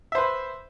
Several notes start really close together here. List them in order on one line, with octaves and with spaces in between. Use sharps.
E5 C5 B4